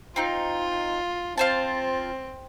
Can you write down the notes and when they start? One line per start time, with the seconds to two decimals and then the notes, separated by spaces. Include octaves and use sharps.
0.16 C4 D#4 F4
1.38 C4 F4 C5 A5